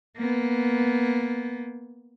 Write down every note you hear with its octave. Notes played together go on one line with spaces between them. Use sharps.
A#3 B3